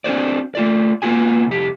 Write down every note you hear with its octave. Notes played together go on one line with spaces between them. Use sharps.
C4 D4 D#4 F#4 C5 D5
A3 F4 D5
A#3 B3 F4 F#4 G#5
C2 F2 G4